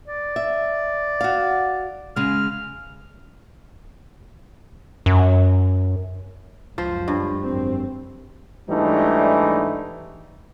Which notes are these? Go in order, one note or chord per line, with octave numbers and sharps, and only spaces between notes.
D5
E5
F#4 F5
C#3 G#3 F6
F#2
C#2 F#2 F3 C5
G2
G#1 F#2 C4
G#2 E3 G3 A3 D4 D#4